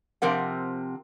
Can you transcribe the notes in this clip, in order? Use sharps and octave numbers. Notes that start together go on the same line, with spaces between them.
C3 F3 C4 A#4 F#5